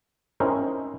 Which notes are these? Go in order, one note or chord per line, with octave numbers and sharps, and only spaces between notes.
C4 C#4 D#4 E4 A#4 C5